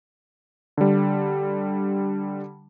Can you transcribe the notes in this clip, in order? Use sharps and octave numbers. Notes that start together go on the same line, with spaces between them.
D3 G3